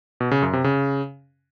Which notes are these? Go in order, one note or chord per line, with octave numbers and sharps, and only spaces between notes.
B2
C#3
F#2
C3
C#3